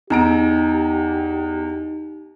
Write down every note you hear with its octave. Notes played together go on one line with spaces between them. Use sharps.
E2 D#4 G4 A#5 D7